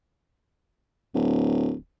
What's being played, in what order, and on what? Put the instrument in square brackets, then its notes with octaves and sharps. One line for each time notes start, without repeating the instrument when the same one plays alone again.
[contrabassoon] D1